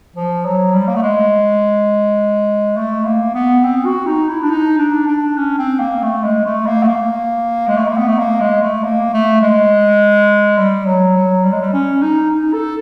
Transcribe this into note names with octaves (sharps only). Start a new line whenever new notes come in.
F3
F#3
G3
A#3
A3
G#3
A3
A#3
B3
C4
F#4
D#4
E4
D4
D#4
D4
D4
C#4
C4
A#3
A3
G#3
A3
A#3
A3
A#3
G#3
A3
A#3
B3
A3
A#3
G#3
A3
A#3
A3
G#3
G3
F#3
F#3
G3
G#3
G3
C#4
D#4
D#4
A4